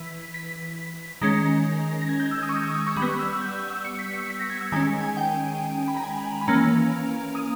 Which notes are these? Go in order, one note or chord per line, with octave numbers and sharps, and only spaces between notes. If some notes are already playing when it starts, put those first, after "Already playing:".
Already playing: E3 B6
B6
D#3 G#3 C#4 A#6
A#6
G#6
G6
E6
D#6
C#6
D#6
E6
D#6
C#6
G3 B5
B3
C#6
E6
E6
G6
E6
C#7
B6
C#7
B6
A#6
G#6
E6
D#3 G#3 C#4 G#5
G#5
G5
B5
A#5
G#5
B5
E3 A#3 C#4 A#5
D#6